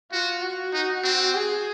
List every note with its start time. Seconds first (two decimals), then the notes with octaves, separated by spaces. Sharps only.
0.11 F4 F#4
0.42 F#4
0.73 D#4
1.04 C4
1.34 G#4